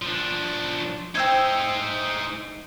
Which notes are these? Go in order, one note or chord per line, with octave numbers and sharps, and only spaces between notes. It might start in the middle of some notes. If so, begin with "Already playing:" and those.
F3 D4
C4 D#4 C5 E5 G#5